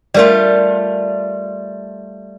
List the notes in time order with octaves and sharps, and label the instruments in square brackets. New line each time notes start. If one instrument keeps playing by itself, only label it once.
[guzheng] G3 A3 F4 [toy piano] A#4 D5